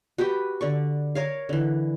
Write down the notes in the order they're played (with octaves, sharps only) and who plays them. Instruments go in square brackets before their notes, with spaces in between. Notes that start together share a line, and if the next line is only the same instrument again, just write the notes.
[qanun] F#4 G4 B4 G5
D3 D5 C#6
A#4 C#5 F5
D3 E3